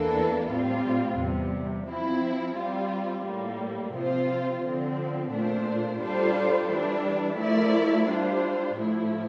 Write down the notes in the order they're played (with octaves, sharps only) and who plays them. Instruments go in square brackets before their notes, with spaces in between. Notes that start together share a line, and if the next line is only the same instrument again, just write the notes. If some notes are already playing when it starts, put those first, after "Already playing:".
Already playing: [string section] E2 E3 A#3 D4 A4
A2 G3 C4 F4
E2 C3 G3
F3 C4 E4
G3 C4 F4
A2 G3 A#3
C3 F3 C4 F4 C5
D3 F3 C4
A#2 A3 D4 F4 C5
G3 D4 F4 A4 C5
E3 G3 D4
F3 A3 E4 A#4 D5
G3 D4 F4 C5
A2 F3 A3 E4